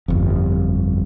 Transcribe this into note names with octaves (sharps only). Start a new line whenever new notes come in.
G1 F2